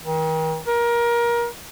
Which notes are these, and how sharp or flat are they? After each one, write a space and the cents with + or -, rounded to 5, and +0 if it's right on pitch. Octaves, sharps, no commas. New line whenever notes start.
D#3 +40
A#4 +25